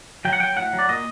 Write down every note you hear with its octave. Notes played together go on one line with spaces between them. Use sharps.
F#3 G5
F#5
F#3 G5
A2 F#5
F#3
D5
A#2 D#5